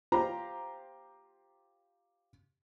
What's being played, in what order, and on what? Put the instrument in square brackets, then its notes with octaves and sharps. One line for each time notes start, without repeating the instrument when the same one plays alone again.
[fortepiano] F4 G4 C5 A#5